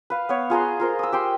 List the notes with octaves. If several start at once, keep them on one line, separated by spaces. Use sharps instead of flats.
B4 F5
B3 C#5
F4 G#4 A#5 C6
F4 A#4 C5
D#6 E6
G4 G5 C6